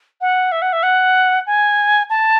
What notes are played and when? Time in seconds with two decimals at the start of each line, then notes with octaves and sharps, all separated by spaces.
0.21 F#5
0.52 E5
0.62 F#5
0.73 E5
0.83 F#5
1.47 G#5
2.10 A5